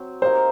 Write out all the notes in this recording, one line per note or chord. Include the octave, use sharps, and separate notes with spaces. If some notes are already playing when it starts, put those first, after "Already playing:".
Already playing: F#3 C4
A#3 D#4 G4 A#4 C5